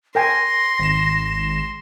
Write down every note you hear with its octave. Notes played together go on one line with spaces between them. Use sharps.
A#4 G5 G#5 C6 A#6
G#1 E7